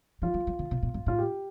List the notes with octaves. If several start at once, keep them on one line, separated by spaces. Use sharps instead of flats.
F3 F4
G3
G3
D3
C3
A#2
G2
A2 F4
G4